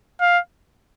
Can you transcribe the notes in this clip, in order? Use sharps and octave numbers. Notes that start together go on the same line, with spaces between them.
F5